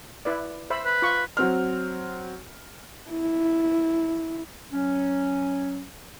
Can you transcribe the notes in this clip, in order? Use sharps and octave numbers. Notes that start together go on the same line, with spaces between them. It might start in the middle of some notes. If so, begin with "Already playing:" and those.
E4 B4 D5
C5 E5 B5
B4
F4 C#6
F#3 C4 F6
E4
F#3 C#4